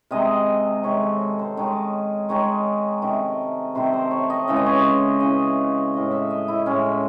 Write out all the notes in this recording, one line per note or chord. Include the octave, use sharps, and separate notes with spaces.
C3 D#3 G#3 D#5
C3 D#3 G#3 C#5
A4
A4
C5
D#3 G#3 C#5
D#3 G#3 C#5
C3 D#3 A3
C3 D#3 A3 C5
C5
C#5
D#5
C#3 E3 G#3 E5
D#5
C#5
D#5
C#3 E3 G#3 D#5
A2 G#3 D#5
E5
D#5
E4
A2 G#3 C#4